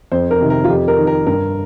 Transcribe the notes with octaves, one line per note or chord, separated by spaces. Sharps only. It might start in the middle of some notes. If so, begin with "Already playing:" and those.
F2 C5
A#4
C3 D#3
A#4
F4
F2 G4
A#4
D#3
A#4
G2 A#4